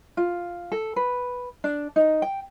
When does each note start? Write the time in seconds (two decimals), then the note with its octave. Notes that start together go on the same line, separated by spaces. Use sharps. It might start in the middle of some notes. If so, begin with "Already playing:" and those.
0.17 F4
0.72 A4
0.96 B4
1.64 D4
1.96 D#4
2.22 G5